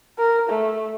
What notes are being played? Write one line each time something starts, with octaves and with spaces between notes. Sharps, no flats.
A#4
A3